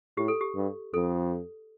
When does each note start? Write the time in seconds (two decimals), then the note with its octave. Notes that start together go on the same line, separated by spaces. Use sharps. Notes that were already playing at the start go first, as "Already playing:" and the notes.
0.17 A2 G4
0.28 A4
0.41 G4
0.55 G2
0.94 F2 A4